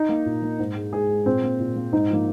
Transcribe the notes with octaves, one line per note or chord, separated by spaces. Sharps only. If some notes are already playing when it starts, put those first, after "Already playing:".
Already playing: D#4
A#3
A#2
A#3
G#2
G#3
G#2 G#4
G#3
A#2 C4
A#3
A#2
A#3
G#2 D#4
F3 A#3